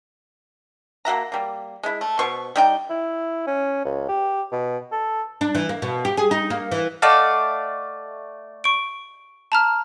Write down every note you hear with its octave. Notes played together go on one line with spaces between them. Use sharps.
A#3 F#4 E5 A#5
G3 A#3
G#3 E4
A3
B2 B3 C5 C#6
G3 D#4 G5
E4
C#4
C#2
G4
B2
A4
D4
E3
A#3
B2
G4
G#4
D#4
A#3
E3
A3 D5 D#5 F5 F#5 A5
C#6 D7
A5 A#5 F6